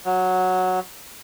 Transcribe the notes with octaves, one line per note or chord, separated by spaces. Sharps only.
F#3